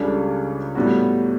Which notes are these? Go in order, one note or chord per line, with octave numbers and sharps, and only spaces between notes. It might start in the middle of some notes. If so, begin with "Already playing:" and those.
Already playing: C#2 C#3 G3 D4 A4
A2 G3 B3 F#4